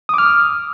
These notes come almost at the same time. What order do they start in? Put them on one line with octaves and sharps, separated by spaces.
D#6 D6 F6